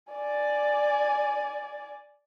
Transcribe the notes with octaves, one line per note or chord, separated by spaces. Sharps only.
D5 G#5